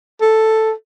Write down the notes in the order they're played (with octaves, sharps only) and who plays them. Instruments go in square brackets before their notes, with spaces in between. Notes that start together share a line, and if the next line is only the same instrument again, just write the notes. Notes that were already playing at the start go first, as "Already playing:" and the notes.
[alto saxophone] A4